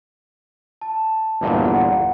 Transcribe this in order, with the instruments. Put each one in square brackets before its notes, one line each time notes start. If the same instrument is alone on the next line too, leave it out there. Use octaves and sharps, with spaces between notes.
[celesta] A5
[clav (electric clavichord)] G1 E2 A#2
[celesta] F#5